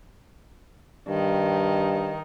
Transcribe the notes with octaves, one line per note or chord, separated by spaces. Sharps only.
G2 D#3